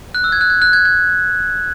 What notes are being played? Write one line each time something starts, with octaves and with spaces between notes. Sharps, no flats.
F#6
E6
G#6
F#6
G#6
F#6
G#6
G#6